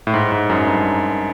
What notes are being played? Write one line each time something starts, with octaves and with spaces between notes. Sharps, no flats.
A2
G#2
G#2
F#2
G2